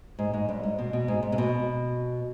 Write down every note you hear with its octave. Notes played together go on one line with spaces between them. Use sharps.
G#2
G#2
G2
G#2
B2
B2
G#2
G#2
C3
B2